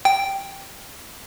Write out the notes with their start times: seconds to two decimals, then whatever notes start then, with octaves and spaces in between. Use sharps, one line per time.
0.05 G5